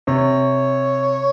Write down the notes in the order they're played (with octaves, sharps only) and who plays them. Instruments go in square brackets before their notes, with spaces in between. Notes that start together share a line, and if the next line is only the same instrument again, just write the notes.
[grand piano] C3 [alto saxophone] C#5